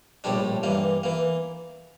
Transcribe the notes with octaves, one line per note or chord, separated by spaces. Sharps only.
A#1 A2 G3 D4
G2 E3 A#3
E3 A#3